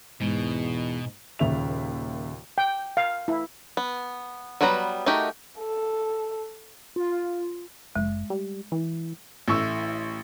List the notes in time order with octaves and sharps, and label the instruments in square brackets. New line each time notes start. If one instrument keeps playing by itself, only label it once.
[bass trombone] E2 [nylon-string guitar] G#2 [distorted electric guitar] B2
[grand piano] D#1 D#2 C#3 E5 F7
[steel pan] G5
F5
E4
[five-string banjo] B3
F#3 G3 B3 B4 A#5
A3 D#4 F#4 G4 A#4
[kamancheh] A4
[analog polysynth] F4
[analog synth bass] F#1 [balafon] G#3
[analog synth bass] G3
E3
[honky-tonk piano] A1 A3 E4 C#6 E6